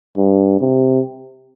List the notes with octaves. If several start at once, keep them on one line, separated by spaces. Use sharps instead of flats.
G2
C3